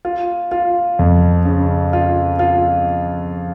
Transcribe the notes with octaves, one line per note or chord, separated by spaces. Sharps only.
F4
F4
F2
C#3
F4
F4